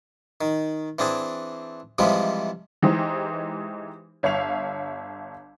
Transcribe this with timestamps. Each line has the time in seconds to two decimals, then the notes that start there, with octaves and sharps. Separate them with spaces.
0.41 D#3
0.99 E3 C4 D4 G#4
1.98 C3 E3 F3 G3 G#3
2.82 E3 G#3 D#4 G4 C5
4.23 G1 C#5 E5 F5 F7